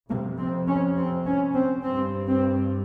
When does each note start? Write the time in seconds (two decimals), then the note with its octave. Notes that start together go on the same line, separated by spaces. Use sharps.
0.10 F2 A#3
0.15 C3
0.39 C4
0.67 C#4
0.97 C4
1.26 C#4
1.54 C4
1.84 G2 C4
2.27 C4